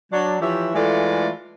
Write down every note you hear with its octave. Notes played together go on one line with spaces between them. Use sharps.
F#3 D4
E3 F3 G4 C#5 E5
E3 G#3 A3 F4 A4 D5